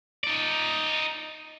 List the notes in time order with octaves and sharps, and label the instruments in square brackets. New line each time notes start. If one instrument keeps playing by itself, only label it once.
[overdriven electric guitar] D#4 D5